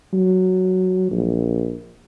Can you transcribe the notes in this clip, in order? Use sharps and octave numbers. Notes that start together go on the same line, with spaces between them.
F#3
A#1